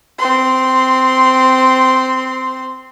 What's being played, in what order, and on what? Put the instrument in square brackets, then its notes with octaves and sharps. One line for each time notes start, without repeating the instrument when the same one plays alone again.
[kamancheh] C4 C6